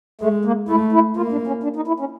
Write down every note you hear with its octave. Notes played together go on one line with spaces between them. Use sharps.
G#3 A3
A#3
A3 E4
E4
A#3 F4
D4
C#4
D4
D#4
E4
C#4